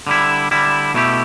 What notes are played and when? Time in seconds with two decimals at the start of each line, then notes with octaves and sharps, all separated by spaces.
0.07 D3 G3 E4
0.51 D3 G3 E4
0.94 B2 A3 E4 G4